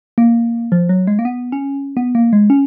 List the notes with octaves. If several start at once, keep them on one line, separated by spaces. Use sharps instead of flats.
A#3
F3
F#3
G#3
A#3
B3
C#4
B3
A#3
G#3
C#4